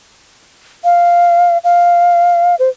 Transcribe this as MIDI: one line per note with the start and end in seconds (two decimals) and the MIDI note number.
0.84 1.58 77
1.64 2.55 77
2.59 2.69 72